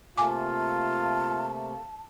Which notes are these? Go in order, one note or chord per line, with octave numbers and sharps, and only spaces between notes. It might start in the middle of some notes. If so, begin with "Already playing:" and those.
C3 A3 A#3 F4 G#5 A5 D6